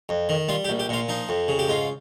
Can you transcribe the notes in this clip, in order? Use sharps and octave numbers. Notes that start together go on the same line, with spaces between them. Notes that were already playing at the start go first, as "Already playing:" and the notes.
F2
D#3
G3 F4
G4
A#1
G4
A#2 F4
F3 D#4
F2
C#3
G4
G#2 F4